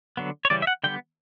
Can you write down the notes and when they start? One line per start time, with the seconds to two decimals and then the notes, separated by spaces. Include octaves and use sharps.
0.17 D3 F#3 B3
0.45 C#5
0.50 C#3 E3 G3 C#4 D5
0.62 E5
0.67 F#5
0.84 D3 G3 B3 G5